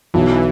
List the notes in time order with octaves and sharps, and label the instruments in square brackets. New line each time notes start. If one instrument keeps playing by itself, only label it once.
[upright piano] B1 [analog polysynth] E3